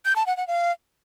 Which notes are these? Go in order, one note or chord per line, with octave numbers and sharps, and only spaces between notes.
G6
A5
F#5
F#5
F5